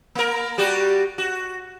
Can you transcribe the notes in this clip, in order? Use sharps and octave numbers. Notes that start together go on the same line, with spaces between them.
A#3 A#4
G3 F#4 G4
F#4